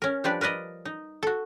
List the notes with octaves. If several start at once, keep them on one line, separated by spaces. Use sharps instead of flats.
C#4 A#4
F3 G3 D4 G4 B4 D5
A#4 B4 D5 D#5
D#4
F#4 A4